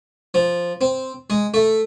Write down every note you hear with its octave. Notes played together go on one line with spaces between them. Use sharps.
F3
C4
G#3
A3